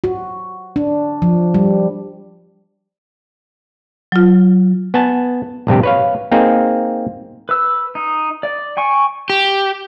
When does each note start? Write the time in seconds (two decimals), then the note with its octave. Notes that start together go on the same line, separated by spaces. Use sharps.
0.04 F#4
0.76 D4
1.22 F3
1.54 G3
4.12 F#3 F4
4.94 B3 G#5 A5
5.67 A#1 G2 C3 G4
5.83 B4 C#5 F5
6.32 A#3 C4 D#4 G#4
7.49 B4 E6
7.95 D#4
8.43 D5
8.77 G5 G#5 C#6
9.30 G4